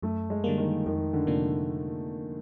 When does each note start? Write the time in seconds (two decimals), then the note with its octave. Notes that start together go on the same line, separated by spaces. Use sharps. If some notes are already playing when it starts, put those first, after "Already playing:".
0.02 F#2 A3
0.30 G#3
0.44 D3 G3 A#3
0.58 D#3
0.86 F2 D#3
1.13 D3
1.27 C3 F3 A#3 D4